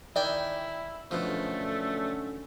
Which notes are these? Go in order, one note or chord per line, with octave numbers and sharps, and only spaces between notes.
D#3 E4 D5 G5 G#5
F#2 B2 D3 F3 A3 C#4